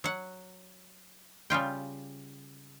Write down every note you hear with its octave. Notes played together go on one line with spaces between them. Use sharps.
F#3 F#5
C#3 G3 F4 G5